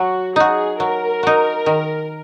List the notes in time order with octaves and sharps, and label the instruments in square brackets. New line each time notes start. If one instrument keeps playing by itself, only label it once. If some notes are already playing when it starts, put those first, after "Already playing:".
Already playing: [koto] F#3 [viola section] F#4
[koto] D#4 F#4 [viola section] G#4
[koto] F#3 [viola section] A#4
[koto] D#4 F#4
D#3